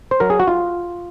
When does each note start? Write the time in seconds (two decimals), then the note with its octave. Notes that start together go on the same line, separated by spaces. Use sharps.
0.11 C5
0.20 F#3 A#4
0.30 G#4
0.39 F#4
0.47 F4